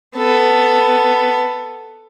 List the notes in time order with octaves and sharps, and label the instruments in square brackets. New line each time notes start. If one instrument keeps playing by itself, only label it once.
[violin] B3 A4